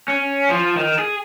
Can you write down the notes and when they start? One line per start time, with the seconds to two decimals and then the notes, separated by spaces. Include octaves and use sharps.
0.08 C#4
0.50 F3
0.77 D#3
0.99 G#4